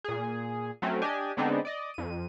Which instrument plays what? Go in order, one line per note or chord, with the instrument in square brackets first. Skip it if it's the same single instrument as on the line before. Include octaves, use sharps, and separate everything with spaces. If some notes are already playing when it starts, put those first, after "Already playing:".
[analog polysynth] A#2 G#4
F#3 A3 C4 C#4
D4 G4 D#5 G#5
D3 G#3 B3 C4 D4 D#4
D5 D#5
F2 D#7